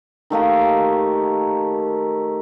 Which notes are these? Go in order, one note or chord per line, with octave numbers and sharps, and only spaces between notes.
D#3 A3 A#3 G4